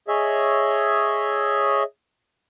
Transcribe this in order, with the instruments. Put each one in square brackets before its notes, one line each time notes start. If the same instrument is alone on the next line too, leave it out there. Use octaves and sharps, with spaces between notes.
[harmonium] G#4 C#5 D#5 E5